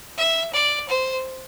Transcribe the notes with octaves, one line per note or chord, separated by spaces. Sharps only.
E5
D5
C5